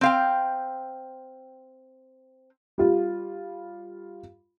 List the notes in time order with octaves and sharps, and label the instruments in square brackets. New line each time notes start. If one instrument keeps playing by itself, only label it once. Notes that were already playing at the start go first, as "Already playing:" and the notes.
[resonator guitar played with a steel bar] C4 F5 G5
[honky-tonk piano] G3 F4